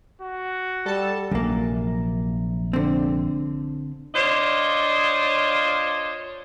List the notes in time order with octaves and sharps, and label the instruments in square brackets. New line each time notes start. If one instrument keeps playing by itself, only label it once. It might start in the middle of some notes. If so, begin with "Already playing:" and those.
[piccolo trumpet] F#4
[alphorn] G3 [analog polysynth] A4 A5
[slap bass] A#1 C3 [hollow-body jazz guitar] F#2 A#3
[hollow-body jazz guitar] D3 C4
[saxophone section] D4 F4 C5 C#5 D#5